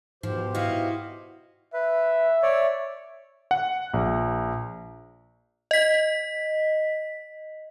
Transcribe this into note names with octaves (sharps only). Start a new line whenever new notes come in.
G#2 B2 F3 G4 C5
E4 F#4 D#5 F5
B4 E5
C#5 D5
F#5
A#1
D#5 B6